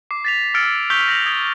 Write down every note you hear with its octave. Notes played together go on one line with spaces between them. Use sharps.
D6 C7
A6 B6 F7
E6 F6 G#6 A6 C#7 D7
C#6 E6 G6 B6 F7 G7
A#6 F7 F#7
D#6 G#6 D7